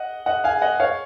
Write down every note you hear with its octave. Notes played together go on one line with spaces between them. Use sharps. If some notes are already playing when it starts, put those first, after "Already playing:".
Already playing: D#5 F#5
D#5 F#5
F5 G#5
D#5 F#5
C#5 F5